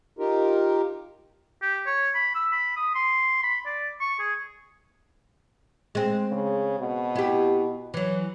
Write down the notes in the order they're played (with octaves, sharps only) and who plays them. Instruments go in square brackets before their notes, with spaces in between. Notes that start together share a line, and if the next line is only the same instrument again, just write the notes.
[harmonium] D#4 F4 G4 A#4
[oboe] G4
C#5
B5
E6
B5
D#6
C6
B5
D5
C#6
G#4
[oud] G#3 C4
[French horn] C#3
B2
[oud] E4 G4
E3 F#3